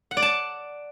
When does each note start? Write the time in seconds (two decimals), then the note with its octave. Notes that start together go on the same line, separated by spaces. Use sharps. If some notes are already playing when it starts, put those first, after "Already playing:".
0.11 F#5
0.17 D5
0.22 A5